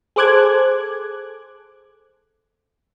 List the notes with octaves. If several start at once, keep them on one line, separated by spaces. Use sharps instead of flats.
G#4 A4 C5 D6 F#6 G#6